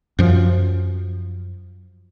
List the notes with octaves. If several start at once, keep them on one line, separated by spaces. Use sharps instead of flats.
F#2 F3